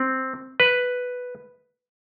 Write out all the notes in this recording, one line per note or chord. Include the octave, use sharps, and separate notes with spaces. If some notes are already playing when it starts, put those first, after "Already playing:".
Already playing: C4
B4